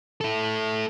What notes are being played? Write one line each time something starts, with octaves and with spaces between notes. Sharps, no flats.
E4 A4